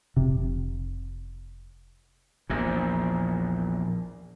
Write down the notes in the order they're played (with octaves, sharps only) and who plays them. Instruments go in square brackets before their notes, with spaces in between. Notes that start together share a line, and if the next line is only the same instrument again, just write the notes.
[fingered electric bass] F1 C3
[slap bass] A#1 E2 A#2